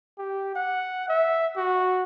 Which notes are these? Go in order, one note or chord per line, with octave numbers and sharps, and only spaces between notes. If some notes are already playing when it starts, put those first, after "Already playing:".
G4
F#5
E5
F#4